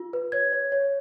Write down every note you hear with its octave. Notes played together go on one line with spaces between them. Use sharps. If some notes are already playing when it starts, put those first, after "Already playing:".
Already playing: F4
B4
C#5 G#6
C#5
C#5